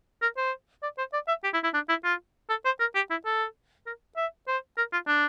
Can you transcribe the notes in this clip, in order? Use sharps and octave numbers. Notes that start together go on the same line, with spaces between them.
A#4
C5
D5
C5
D5
E5
G4
E4
E4
D4
E4
F4
A4
C5
A#4
G4
E4
A4
A#4
E5
C5
A#4
F4
D4